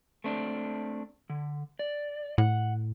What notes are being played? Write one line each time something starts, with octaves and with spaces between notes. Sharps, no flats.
A3 C4 D4
D3
D5
A2 F#5